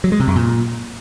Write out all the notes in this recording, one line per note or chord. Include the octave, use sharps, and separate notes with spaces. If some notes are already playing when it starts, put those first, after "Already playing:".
F#3
G#3
C3
F#2
A#2